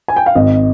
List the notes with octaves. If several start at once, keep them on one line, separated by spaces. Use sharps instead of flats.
G#5
G5
F5
G#1 D#5